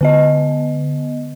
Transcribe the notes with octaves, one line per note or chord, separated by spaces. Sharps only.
D3 B3 D#5